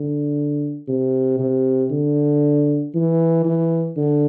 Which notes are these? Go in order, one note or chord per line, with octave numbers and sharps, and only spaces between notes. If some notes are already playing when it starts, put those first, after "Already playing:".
Already playing: D3
C3
C3
D3
E3
E3
D3